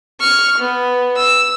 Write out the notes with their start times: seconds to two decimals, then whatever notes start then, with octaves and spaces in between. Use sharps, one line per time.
0.20 C#6 F6
0.59 B3
1.17 E6